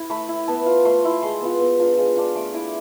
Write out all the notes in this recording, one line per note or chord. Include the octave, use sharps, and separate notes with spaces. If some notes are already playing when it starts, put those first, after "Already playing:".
Already playing: E4
A3 B5
E4
B3 A5
F4
A3 C6
E4
G#3 C6
B3 F4
B3
D4 F4
G#3
D4 F4
A3 D6
E4 D6